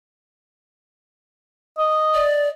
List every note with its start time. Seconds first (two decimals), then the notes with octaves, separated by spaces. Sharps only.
1.78 D#5
2.14 D5